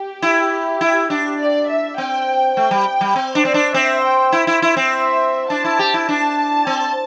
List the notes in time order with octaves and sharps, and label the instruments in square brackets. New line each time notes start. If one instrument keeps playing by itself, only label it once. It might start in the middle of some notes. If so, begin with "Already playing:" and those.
Already playing: [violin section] G4
[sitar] E4
E4
D4
[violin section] D5
E5
[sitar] C4 [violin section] G5
[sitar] A3 [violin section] G5
[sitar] G3
G3
C4
D4
[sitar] C4 [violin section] D5
[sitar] D4
[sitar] C4 [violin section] E5
[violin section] G5
[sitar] E4
E4
E4
C4
[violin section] E5
[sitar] D4 [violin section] A5
[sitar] E4
G4
E4
[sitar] D4 [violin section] A5
[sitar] C4